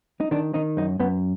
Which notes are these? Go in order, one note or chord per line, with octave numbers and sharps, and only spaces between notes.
D#4
D#3 D4
D#3 D#4
F#2 D#4
F#2 B3